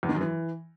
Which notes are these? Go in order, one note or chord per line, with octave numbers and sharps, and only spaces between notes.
E2
D#3
F#2
E3